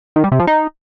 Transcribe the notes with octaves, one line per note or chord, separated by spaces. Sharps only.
D#3
G3
C3
F3
D#4